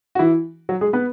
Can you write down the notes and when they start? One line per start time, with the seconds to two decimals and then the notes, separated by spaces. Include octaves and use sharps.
0.15 F#4
0.19 E3 E4
0.69 F#3 F#4
0.81 G#3 G#4
0.93 B3 B4